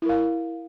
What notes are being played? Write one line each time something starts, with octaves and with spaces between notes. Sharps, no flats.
E4 A#4 F5